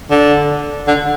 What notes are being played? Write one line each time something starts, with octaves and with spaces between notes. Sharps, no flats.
D3
D3